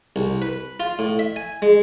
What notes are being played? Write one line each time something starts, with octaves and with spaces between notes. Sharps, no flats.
C2
B4
F4
A2
E5
G#5
G#3